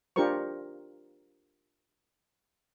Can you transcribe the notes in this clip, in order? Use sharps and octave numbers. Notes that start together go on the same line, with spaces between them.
D4 F4 G4 A#4 C5 C#6